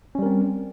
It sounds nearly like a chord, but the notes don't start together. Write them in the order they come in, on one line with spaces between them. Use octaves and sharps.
C#4 G3 A#4 C4